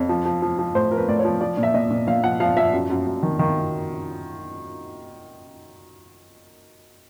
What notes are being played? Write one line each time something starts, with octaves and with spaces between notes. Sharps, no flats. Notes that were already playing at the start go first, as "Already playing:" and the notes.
Already playing: F2 C#5
F3
F3
F3
F3
A2 C5
F3 A#4
B4
A2 D5
C#5
F3
F3 D5
A#2
E5
A#2 D#5
A#2
A#2 F5
F3 F#5
F3 F5
F3 E5
F#2
F#2
F#2
D#3
D#3